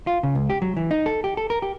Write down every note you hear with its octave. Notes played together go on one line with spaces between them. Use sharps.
F4
C#3
C#2
G4
F#3
E3
D#4
A4
G4
A4
A#4
G4